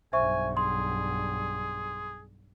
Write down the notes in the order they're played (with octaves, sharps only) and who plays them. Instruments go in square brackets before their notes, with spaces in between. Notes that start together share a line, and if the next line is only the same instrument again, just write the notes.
[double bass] B1 G2 [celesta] C5 E5 C#6 [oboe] G#5
[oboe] G#4 [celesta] C6